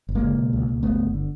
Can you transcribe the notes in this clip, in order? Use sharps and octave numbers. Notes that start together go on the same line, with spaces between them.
G1
G#3 A#3
C#3
B2
C#2
C#2
G1 A3 B3
G1
D3